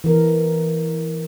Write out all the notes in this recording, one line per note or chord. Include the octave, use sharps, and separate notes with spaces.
E3 A#4